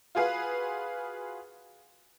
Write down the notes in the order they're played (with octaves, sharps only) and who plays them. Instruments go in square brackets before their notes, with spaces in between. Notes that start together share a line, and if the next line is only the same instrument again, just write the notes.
[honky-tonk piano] F4 F#4 G#4 B4 F5